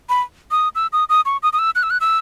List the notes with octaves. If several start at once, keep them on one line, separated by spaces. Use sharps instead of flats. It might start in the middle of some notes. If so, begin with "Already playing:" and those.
B5
D#6
E6
D#6
D#6
C#6
D#6
D#6
E6
F#6
E6
F#6
E6